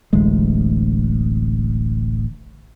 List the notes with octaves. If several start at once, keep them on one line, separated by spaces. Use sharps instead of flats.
D1 A1 D2 G#3